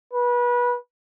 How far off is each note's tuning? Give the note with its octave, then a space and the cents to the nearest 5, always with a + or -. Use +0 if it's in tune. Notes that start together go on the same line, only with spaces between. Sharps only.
B4 -25